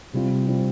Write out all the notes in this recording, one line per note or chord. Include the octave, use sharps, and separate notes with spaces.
C3 G3 C4 F4
C3 G3 C4 F4